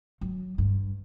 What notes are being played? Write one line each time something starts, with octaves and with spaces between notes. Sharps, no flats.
F#3
G2